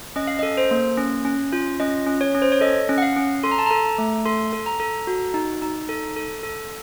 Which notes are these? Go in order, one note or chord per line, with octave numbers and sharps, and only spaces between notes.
C#4 D#5
F5
A4 D#5
C5
A#3
C#4
C#4
F4
C#4 D#5
C#4
C#5
C#4
C5
C#5
A4 D#5
C#4
F#5
F5
C#4
A4 C6
A#5
A5
A4 A#5
A3
A4 C6
A4
A#5
A4
F#4
D#4
D#4
A4
A4
A4